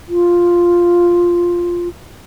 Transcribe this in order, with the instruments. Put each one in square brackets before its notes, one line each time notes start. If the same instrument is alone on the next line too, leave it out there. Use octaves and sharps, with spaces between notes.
[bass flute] F4